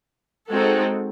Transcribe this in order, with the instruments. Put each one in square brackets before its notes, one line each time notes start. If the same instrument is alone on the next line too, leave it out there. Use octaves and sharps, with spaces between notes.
[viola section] G#3 C4 D#4 F#4 A4